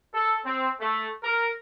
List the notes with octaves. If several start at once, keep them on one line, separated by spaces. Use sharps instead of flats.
A4
C4
A3
A#4